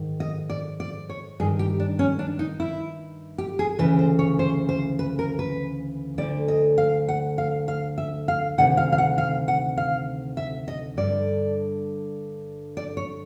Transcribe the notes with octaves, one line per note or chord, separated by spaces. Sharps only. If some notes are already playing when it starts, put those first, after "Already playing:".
Already playing: G#2 D#3
D#5
D5
D5
C#5
G2 D#3 G#4
G4
D4
C#4
D4
D#4
E4
G4
G#4
D2 C#3 E3 B4
C5
C#5
C5
C5
B4
A#4
B4
D2 D3 D5
D#5
F5
F#5
F5
F5
E5
F5
D2 C3 D#3 F#5
F5
F5
F#5
F5
F#5
F5
E5
D#5
G2 D3 D5
D5
C#5